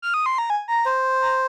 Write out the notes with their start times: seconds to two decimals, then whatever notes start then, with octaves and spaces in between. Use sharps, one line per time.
0.02 F6
0.14 D#6
0.26 C6
0.38 A#5
0.50 G#5
0.68 A#5
0.85 C5
1.22 A#5